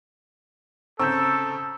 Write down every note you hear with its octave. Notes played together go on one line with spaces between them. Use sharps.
C#3 C4 A4 A#5 C#6 E6 G6